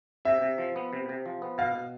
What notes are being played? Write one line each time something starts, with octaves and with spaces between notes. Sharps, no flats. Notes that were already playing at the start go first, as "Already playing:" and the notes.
C3 E5
C3
F3
B3
C3
C3
F3
B3
B2 F5
B2